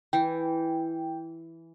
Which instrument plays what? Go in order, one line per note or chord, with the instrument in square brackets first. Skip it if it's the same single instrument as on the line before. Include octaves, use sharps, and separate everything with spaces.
[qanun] E3 [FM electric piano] G5